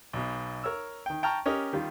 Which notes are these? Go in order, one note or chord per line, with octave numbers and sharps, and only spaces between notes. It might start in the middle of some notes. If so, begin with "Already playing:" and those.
B1 B2
A#4 C#5 E6
D#3 G5
G5 A5 A#5 C#6 F6
C#4 G4 A#4 D#5
D#3 G3 F4